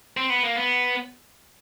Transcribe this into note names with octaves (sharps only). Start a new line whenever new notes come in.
C4
B3
A#3
B3